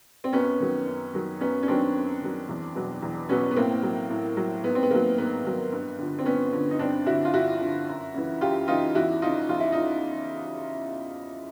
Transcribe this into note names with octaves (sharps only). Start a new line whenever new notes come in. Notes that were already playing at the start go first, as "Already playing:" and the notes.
C4
F#2 B3 C#4
D#3 F#3
F#2
D#3 F#3
F#2 B3 C#4
C#4
D#3 F#3 C4 D4
F#2
D#3 F#3
E2
B2 F#3
E2
B2 F#3 B3 C#4
B3
A2 A#3 C4
F#3
A2
F#3
G#2 B3
C4
B3
D#3 F#3 A#3
G#2 B3
D#3 F#3
G2
D3 F3
C4
G2 B3 C#4
D3 F3
D#4
G2 C4 D4
D3 F3 E4 F#4
F4
G2 E4 F#4
D3 F3
F#2
C#3 E3
F#2 F4 G4
C#3 E3 D#4 F4
E2 E4 F#4
C#3 F3 D#4 F4
E2 F4
E4
F3 D#4